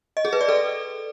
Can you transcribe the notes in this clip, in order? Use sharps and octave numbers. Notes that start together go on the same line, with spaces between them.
D#5
G#4
B4
D5
A4